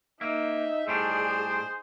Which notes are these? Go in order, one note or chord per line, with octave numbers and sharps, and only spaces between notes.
A#3 D#4 E5
A2 G3 D4 G#4 C5